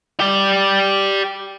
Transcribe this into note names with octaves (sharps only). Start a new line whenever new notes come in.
G4 D5